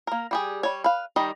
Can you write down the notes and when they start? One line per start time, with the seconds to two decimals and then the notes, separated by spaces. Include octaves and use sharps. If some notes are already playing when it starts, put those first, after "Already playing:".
0.07 A#3 A#4
0.31 G3 G4 G#4
0.63 G3 C#5
0.84 B4 F5
1.16 D#3 G3 D#5